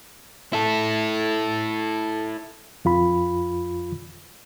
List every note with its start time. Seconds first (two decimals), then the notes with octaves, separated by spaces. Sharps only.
0.53 E4 A4
2.85 F2 F4 B5